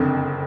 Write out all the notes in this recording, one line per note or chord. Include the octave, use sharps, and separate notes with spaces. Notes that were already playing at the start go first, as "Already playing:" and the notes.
Already playing: F#1 F2 D3